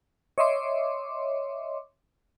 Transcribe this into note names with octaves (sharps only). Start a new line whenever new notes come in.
C#5 D#5 E5 C6 D6